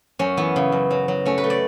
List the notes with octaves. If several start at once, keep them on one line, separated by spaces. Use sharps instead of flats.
F#2 C#4
E3 B3
C#3
F#2
F#3
F#3
A3 C#4
B4
A3
D5